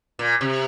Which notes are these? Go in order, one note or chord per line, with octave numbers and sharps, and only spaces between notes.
A#2
C3